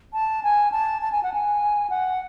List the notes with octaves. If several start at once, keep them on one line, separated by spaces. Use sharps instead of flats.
A5
G#5
A5
A5
G#5
F#5
G#5
F#5